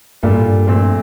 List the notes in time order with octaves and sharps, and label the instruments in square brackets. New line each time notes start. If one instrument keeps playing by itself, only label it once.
[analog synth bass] G2 [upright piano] A#2 G3 A#3 F4 A4
[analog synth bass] A2
G2
[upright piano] A#1 A#2 A3 C4